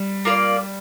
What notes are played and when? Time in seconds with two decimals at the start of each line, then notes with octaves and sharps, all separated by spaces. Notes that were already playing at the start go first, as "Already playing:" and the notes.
Already playing: G3
0.25 A#3 F4 D5